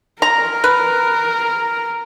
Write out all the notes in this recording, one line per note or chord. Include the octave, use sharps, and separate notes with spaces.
A#4 A#5
B4